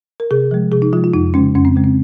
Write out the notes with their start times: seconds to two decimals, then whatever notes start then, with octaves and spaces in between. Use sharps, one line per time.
0.20 A#4
0.31 C3 G#4
0.51 F3 G#3
0.72 C3 G#4
0.82 D#4
0.93 F3 F4
0.97 G#3
1.04 F4
1.14 F2 D#4
1.34 C#3 G#3 C#4
1.55 F2 C#4
1.65 C4
1.76 C#3 G#3
1.84 C4